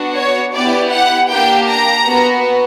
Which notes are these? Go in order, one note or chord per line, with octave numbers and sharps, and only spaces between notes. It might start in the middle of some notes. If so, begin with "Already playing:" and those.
Already playing: B3 D4 F#4
C#5
B3 E4 G4 D5
F#5
A#3 D4 G4 G5
A#5
B3 F#4